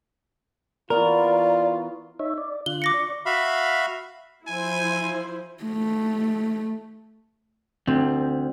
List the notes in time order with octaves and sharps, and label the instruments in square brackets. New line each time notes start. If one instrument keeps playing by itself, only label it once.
[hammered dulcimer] E3 B3 F#4 [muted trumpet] F4 [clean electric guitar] A#4 [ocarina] D5
[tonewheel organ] D#4 C#5 E5
D5
[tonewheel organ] D3 F4 F#6 [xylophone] G7
[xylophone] D6 A#6 C#7
[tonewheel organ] D5 C#6
[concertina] F#4 E5 F5 B5
[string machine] F3 [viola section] E4 C5 [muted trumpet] G#5
[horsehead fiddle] A3
[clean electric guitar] D2 [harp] C4